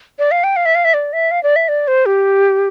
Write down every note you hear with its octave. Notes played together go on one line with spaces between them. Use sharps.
D5
F5
G5
F5
E5
F5
E5
D5
E5
F5
D5
E5
D5
C5
G4